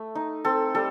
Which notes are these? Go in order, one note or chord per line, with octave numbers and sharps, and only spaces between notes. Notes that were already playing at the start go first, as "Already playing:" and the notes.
Already playing: A3
D#4
C4 A4
G3 A4